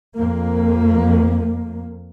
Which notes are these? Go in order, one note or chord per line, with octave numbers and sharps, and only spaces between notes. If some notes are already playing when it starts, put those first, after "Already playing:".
F2 A#3